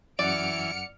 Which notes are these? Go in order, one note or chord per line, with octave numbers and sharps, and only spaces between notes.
F#2 E3 D5 F#5 F6 C#7 D7